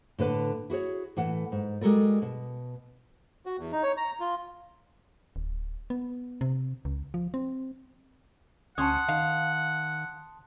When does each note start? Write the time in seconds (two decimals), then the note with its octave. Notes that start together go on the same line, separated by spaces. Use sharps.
0.19 A2 D3 B4 A5
0.70 E4 F#4 G#4 C#5
1.17 A2 E3 F#5
1.52 G#2
1.81 G3 G#3 F#4 A4 A#4 D5
2.22 B2
3.46 F#4
3.59 E2
3.72 D#4
3.83 C#5
3.97 A#5
4.20 F4
5.36 D1
5.90 B3
6.41 C3
6.85 C#2
7.14 F3
7.34 C4
8.78 D2 C#4 F#5 A5 C6 D#6
9.09 D#3 F5